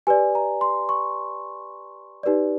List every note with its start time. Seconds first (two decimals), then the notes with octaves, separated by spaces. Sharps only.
0.07 G4 B4 D5 G#5
0.35 A#5
0.61 C6
0.89 C#6
2.23 D#4 G4 B4 D5